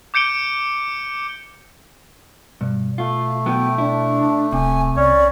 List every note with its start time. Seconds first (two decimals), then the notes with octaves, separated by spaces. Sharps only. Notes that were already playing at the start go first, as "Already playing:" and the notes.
0.14 D6 G6 C#7 D7 G7
2.61 G2 B2
2.98 A3 F4
3.46 F#3 B3 E4 G5
3.78 D4 E4
4.52 D1 C3 G#5
4.96 C2 C#4 C#5 D5